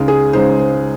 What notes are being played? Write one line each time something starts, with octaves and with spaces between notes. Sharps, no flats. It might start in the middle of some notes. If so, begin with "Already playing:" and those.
Already playing: C#2 C#3 G#3 D#4
G#4
C#2 C#3 G#3 D#4 C5
C5